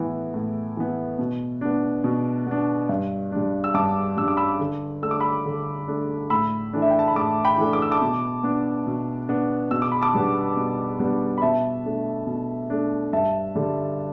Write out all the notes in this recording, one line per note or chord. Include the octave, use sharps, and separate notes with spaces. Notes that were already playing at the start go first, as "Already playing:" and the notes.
Already playing: A2 E3 B3
A2
E3 B3
B2
B3 D4
B2
B3 D4
G2
G3 D4
E6
G2 A5 D6
G3 D4 E6
D6
B5 E6
D3
A3 D4 E6
D6
B5 E6
D3
A3 D4
A2 B5 E6
E3 A3 D4
E5
G5
A5
B5
A2 A5 D6
G5 B5
E3 A3 D4
D6
E6
A5 D6
B2
B3 D4
B2
B3 D4
B2 E6
D6
B5
A5 D6
G3 B3 D4
B2
G3 B3 D4
B5
B2 E5 A5
A3 D4
B2
A3 D4
G2 E5 A5
D3 G3